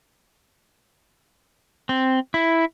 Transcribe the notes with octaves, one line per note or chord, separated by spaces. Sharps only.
C4
E4